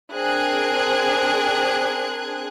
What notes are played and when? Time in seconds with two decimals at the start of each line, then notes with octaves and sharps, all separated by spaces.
0.14 C4 D4 G#4 A#4 F#6 G#6